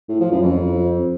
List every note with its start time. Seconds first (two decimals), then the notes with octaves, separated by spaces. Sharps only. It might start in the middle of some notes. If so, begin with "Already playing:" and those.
0.09 A2
0.20 F3
0.32 F#2
0.43 F2